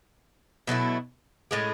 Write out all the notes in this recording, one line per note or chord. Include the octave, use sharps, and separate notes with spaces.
B2 F#3 A3 E4
A2 G#3 C#4 G#4